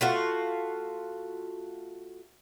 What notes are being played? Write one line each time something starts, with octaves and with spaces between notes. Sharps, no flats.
A3 F4 F#4